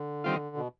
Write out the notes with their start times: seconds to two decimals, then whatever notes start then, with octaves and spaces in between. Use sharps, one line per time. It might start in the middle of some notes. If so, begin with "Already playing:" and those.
Already playing: D3
0.24 D#3 G3 C4 F4
0.56 B2